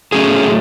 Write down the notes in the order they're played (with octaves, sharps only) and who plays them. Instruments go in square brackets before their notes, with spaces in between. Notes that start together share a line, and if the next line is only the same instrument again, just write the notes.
[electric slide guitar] A2 F#3 A3 C#4 G#4